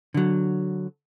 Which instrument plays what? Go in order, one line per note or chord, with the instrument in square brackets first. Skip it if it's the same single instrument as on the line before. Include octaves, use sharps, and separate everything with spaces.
[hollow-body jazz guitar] D3 F#3